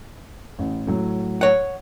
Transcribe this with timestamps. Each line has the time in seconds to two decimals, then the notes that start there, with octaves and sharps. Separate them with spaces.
0.59 A1
0.87 A2 F#3
1.41 C#5 F#5